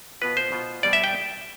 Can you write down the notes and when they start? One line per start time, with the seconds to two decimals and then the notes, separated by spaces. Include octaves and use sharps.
0.21 B2 B3 F4 B4
0.37 C5
0.52 B2 B3 F4
0.83 B2 G3 B3 D5
0.93 E5
1.04 G5